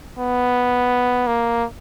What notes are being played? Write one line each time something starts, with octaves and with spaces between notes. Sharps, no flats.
B3
A#3